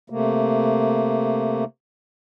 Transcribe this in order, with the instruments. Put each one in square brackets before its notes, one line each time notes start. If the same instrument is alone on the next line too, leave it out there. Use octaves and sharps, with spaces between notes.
[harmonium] C3 A3 A#3